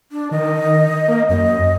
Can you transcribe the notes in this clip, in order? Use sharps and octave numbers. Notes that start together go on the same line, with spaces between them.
D4
D#3 D#5
A#3
F#2 D#5